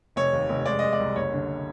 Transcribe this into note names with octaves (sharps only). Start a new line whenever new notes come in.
F1 C#5
D#2
F1
G#3 D5
G#3 D#5
D5
C2
F#1 C#5
D3